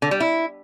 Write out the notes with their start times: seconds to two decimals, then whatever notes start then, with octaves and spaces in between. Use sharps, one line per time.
0.02 D3
0.11 G3
0.20 E4